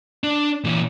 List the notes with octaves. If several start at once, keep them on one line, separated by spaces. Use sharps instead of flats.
D4
A#2 E3